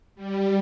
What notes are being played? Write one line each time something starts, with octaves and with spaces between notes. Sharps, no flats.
G3